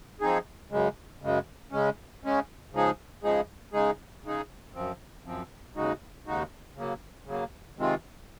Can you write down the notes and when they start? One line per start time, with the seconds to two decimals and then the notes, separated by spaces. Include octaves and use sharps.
0.21 F3 C4 D#4 G#4
0.70 F#2 C#3 G#3
1.22 F#2 C#3 G#3
1.72 C#3 G#3 C#4
2.23 C#3 G#3 C#4
2.73 C#3 F3 G#3 D#4 G#4
3.23 C#3 F3 G#3 D#4 G#4
3.73 C#3 G#3 D#4 G#4
4.24 C#3 G#3 D#4 G#4
4.74 F#2 F3 C4
5.25 F#2 F3 C4
5.75 D#2 C#3 G#3 D#4 F#4
6.26 D#2 C#3 G#3 D#4 F#4
6.75 C#3 F#3 A#3
7.26 C#3 F#3 A#3
7.77 C3 D#3 G#3 C4 F4